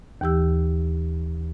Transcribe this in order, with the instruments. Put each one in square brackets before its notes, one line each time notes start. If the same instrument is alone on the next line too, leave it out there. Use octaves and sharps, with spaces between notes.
[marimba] D#2 E3 G4 E6